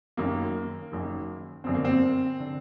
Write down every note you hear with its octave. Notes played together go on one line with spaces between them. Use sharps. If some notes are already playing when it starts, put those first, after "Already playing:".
F#1 F#2 D#3 A#3
F#1 F#2 D#3
G1 F#2 D3 C4
A#3
C4
D3